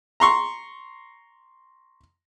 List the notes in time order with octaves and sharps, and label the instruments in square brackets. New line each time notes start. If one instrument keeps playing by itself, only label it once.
[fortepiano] A#5 C6 C#6